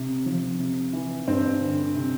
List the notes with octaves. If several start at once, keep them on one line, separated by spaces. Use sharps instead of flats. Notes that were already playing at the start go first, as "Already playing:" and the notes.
Already playing: C3
F3
C3
E3
G2 C4
D3
C3